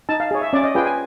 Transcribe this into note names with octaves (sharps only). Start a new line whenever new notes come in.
D#4 A5
F5
G#4 C#5
E5
C#4 D5
D#5
F4 G#4 B4 G5
G#5